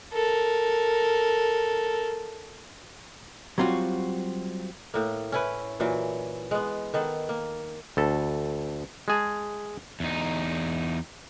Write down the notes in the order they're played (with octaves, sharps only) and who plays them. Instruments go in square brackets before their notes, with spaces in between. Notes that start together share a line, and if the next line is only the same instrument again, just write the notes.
[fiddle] A4 A#4
[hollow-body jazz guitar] F#3 G3 C4 F4 F#4
[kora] A2 A#3
C#4 E4 B4
A#2 E3 F#3
G#3 B3
D#3 B3 A4
A#3
[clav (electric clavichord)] D2 A4
G#3 G#4 A5
[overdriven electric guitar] E2 D#4